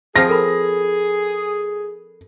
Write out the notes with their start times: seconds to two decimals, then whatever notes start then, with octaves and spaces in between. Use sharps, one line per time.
0.16 F3 C4 F4 G#4 A#6
0.29 A4 A#4 B5